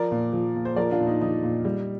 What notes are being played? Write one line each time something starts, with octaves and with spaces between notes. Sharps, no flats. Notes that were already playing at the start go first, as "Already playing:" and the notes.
Already playing: F3 A#4 D5
A#2
F3
A#2
C5
F3 A#4 D5
D4 F4
A#2
D#4
F3 D#4
A#2
G3